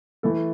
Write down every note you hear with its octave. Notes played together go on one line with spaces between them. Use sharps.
E3 A3 E4 A4